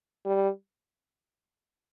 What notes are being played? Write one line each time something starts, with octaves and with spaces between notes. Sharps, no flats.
G3